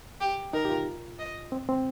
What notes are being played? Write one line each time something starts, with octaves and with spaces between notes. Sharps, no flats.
G4
D#4 A#4
G4
F4
D#5
C4
C4